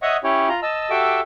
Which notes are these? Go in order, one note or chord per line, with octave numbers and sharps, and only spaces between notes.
C#5 D#5 E5 F#5 C#6 D#6
C#4 E4 G4 C#5
F4 A#5
D#5 A5 E6
F#4 G4 A4 E5 D6 E6